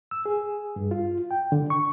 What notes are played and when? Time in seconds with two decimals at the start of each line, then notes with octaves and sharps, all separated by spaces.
0.11 E6
0.26 G#4
0.76 G2
0.91 F4
1.31 G5
1.52 D3
1.70 C#6